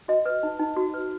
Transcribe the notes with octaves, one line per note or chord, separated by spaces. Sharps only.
F#4 D#5
B4
D#4
D#4
F#4
B4